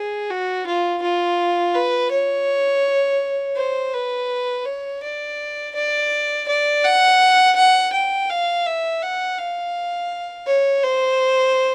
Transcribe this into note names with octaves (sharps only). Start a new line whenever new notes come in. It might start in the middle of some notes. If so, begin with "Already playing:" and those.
Already playing: G#4
F#4
F4
F4
B4
C#5
C5
B4
C#5
D5
D5
D5
F#5
F#5
G5
F5
E5
F#5
F5
C#5
C5